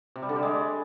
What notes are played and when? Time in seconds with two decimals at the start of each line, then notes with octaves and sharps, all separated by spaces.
0.16 C3
0.22 G3
0.29 D3
0.36 G3
0.43 G#3